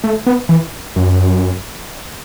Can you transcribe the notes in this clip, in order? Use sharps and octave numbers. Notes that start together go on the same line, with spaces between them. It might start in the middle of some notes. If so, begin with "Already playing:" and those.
A3
B3
E3
F#2